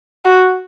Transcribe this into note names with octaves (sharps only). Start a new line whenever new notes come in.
F#4